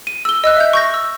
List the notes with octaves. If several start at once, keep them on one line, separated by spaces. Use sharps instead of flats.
D#7
E6 G7
D#5 E6 F#6
E5 G6
C#6 G6 A#6
E6